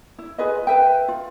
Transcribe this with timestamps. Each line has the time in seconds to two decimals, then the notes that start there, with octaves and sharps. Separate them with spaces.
0.18 E4
0.38 F4 G#4 B4 D#5
0.67 B4 E5 G5
1.08 F4